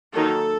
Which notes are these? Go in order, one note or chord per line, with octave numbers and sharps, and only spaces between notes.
D#3 F#3 A#3 D#4 A4